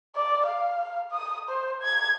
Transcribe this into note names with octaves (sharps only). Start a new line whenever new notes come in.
D5
F5
D#6
C5
G#6